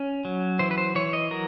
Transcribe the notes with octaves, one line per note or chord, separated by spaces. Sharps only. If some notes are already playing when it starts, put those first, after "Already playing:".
Already playing: C#4
F#3
E3 C5
B4
C5
E3 C#5
D#5
F#3 A#4